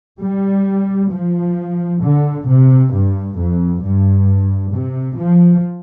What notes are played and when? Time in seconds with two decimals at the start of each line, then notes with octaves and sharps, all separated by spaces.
0.20 G3
1.11 F3
2.01 D3
2.47 C3
2.92 G2
3.37 F2
3.82 G2
4.72 C3
5.17 F3